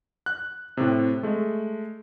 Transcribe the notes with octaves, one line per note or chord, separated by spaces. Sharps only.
F#6
A2 C3
G#3 A3